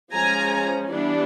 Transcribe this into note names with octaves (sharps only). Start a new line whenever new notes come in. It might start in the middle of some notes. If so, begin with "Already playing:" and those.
F3 G#3 C#4 G#5 A#5
E3 G3 B3 D4